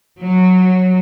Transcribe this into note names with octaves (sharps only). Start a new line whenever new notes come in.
F#3